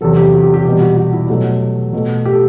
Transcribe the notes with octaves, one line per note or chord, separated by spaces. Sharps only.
E2 C3 F#3 A4
G4
F#4
G4
G4
E2 B2 G3 G4
F#4
F#4
E4
B2 F#3 A3 F#4
B2 A3
G4
A4